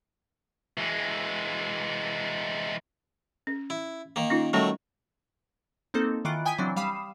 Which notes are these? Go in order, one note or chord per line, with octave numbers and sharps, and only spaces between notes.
E3 G#3
C#4
E4
D#3 A#3
C#4 D#4 F4
D#3 F#3 G3 A3 C#4
A#3 C4 D#4 A4
D#3 E3 F4 F#6 D7
G5 G#5 D#6 G#6 B6 D#7
C#3 E3 F#3 C4 D4
G3 F5 B5 D#6 C7 E7